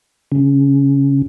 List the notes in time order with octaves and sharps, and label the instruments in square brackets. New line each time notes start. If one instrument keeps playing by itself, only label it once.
[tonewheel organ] C#3